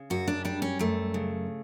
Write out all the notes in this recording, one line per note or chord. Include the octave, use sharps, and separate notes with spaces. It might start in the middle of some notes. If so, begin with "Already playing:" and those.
Already playing: C#3
F#2 F#4
D4
G3 D4
C#4
F#2 A3
C#3